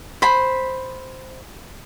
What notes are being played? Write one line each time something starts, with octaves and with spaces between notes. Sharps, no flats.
C5 B5